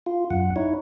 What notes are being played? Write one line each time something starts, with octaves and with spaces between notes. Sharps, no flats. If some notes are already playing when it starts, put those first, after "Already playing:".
F4
F#2 F#5
D#4 E4 C#5